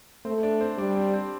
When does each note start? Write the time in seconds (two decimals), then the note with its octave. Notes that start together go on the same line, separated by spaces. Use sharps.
0.25 A3 C4 C5
0.43 D4 D5
0.60 C4 C5
0.78 G3 D4 D5
0.96 C4 C5
1.13 C4 C5